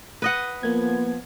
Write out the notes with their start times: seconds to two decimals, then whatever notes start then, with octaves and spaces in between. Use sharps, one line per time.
0.22 B4 D#5 F#5
0.63 F3 A#3 B3 G#6